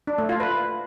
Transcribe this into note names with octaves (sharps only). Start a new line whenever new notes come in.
D4
A3
F4
B4